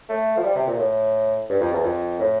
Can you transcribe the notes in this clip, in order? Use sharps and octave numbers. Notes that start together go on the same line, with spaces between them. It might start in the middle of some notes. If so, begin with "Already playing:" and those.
A3
F3
G3
C3
A#2
A2
G2
F2
E2
F2
A2